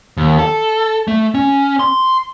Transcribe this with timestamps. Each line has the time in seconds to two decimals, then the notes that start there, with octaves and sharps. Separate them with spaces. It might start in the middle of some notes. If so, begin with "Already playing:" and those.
0.17 D#2
0.39 A4
1.08 A3
1.34 C#4
1.79 C6